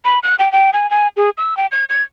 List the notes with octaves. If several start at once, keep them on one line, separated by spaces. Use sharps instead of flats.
B5
F#6
G5
G5
G#5
G#5
G#4
E6
G5
G#6
G#6